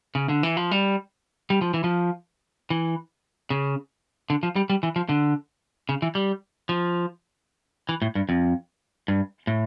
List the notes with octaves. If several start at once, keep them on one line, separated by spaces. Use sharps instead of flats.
C#3
D3
E3
F3
G3
G3
F3
E3
F3
E3
C#3
D3
F3
G3
G3
E3
F3
D3
C#3
E3
G3
F3
E3
A2
G2
F2
G2
A2